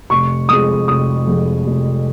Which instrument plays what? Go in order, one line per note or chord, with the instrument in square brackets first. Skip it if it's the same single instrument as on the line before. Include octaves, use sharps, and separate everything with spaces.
[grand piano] F1 C#6
F2 F3 G#3 D#6
F1 D#6
F2 F3 G#3
F1